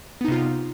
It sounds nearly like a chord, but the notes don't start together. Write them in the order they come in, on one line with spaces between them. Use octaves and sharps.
B3 D#4 C3 F4